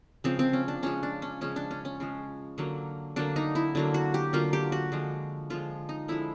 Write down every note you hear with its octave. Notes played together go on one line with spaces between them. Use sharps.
C#3 F3 G#3 C4
C4
C#4
D4
C#3 F3 G#3 C#4
D4
C#4
C#3 F3 G#3 C#4
D4
C#4
C#4
C#3 F3 G#3
D3 F#3 A#3
D3 F#3 A#3 D4
D#4
E4
D3 F#3 A#3
F#4
G4
D3 F#3 A#3 F4
G4
F#4
D3 F3 G#3
D3 F3 G#3 F4
D#4
D3 F3 G#3 E4